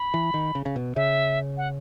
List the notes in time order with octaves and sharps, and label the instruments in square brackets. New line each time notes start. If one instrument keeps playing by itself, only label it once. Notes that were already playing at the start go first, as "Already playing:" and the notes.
Already playing: [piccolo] B5
[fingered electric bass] E3
D#3
C#3
C#3
B2
[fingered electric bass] C#3 [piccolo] E5
[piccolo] F#5